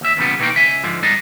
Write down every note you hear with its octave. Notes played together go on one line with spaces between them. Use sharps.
D#2 E5
E2 A#2 C#3 G3 B3
B2 D#3 E3 F#3 A#3 G5
C#2 E5 G#5
G#2 D3 F3
E2 G2 G3 D4 D#4